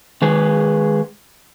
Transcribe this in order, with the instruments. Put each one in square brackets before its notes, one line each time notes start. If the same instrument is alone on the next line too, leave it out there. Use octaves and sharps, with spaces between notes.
[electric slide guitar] D#3 G#3 G#4 B4